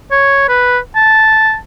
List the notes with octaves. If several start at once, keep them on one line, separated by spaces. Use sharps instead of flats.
C#5
B4
A5